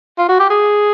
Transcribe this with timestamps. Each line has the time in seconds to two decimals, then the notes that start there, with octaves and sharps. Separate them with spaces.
0.18 F4
0.29 F#4
0.40 G4
0.50 G#4